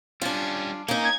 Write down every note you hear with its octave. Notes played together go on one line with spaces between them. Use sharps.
G3 C#4 D4 F4
A#3 C#4 D#4
G#6